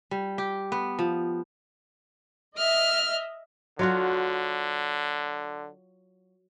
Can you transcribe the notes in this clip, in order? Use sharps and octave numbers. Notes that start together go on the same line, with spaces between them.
G3
G4
B3
F3
D#5 E5 F6
D3 F#3 F4 F#4